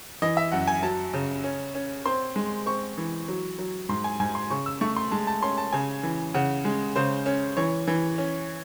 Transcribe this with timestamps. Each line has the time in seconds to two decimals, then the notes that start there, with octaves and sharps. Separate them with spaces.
0.22 E3 D#5
0.37 E5
0.52 F#2 F#5
0.67 G#5
0.82 F#3 A5
1.14 C#3
1.43 C#4
1.75 C#4
2.06 C4 C6
2.36 G#3
2.66 C4 C#6
2.98 E3
3.28 F#3
3.59 F#3
3.89 G#2 C6
4.04 G#5
4.20 G#2 G#5
4.35 C6
4.50 C#3 C#6
4.66 E6
4.81 A3 C#6
4.96 C6
5.11 G#3 A5
5.27 A5
5.43 C#4 C6
5.58 A5
5.73 C#3 G#5
6.03 E3
6.34 C#3 F#5
6.65 G#3
6.96 C#3 C5
7.26 C#4
7.57 E3 C#5
7.87 E3
8.18 C#4